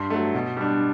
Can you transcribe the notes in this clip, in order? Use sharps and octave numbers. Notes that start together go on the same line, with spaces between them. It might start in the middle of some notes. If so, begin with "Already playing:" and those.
Already playing: G2 C6
F#3 A3
B2
G3 D4